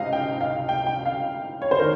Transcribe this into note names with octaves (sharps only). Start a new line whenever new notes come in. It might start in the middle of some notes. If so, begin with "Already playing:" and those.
Already playing: C#2 C3 D#5 F5
G5
F5
G5
G5
F5
C#5
C5
D#3 A#4